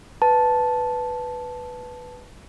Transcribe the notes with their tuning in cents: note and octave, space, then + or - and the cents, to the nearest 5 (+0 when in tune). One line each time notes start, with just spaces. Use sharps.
B4 +0 A5 -5